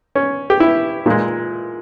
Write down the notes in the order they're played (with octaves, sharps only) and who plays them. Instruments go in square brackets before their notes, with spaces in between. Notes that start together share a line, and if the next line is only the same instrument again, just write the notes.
[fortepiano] C#4
G4
E4
A#2 G#3